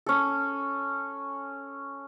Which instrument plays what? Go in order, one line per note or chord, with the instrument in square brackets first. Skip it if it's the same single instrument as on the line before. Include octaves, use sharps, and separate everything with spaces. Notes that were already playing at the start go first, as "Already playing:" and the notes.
[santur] C#4 A4